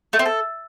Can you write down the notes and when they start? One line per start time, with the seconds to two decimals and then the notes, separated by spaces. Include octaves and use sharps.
0.13 A3
0.19 C4
0.26 A4